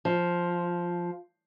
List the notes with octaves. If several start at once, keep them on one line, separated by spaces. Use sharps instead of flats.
F3